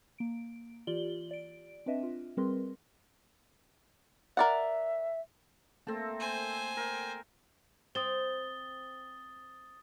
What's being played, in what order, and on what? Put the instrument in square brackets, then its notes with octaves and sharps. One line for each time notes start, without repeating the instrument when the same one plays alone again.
[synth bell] A#3 D7
E3 F4 G4 D5 F#7 G7
D5 D7
C4 D4 B4 D#5 E5
F4
G3 C4 G#4 A#4 B4 C6
[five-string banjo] A#4 D5 F#5 [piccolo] E5
[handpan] A3 A#3 A4 [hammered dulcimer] C4 A5
[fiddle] C5 G#5
[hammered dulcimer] A#4 G5
[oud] C4 [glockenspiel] D#6 A6 G7